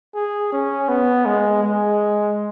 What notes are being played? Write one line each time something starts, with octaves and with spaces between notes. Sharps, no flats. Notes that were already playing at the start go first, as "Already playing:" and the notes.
G#4
C#4
B3
G#3
G#3